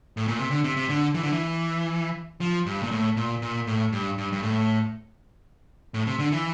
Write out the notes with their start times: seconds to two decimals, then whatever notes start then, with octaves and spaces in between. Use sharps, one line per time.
0.17 A2
0.28 A#2
0.39 C3
0.51 D3
0.64 C3
0.77 C3
0.89 D3
1.15 E3
1.23 D3
1.32 E3
2.41 F3
2.66 G2
2.83 A#2
2.91 A2
3.17 A#2
3.42 A#2
3.67 A2
3.92 G2
4.18 G2
4.32 G2
4.43 A2
5.94 A2
6.07 C3
6.19 D3
6.32 E3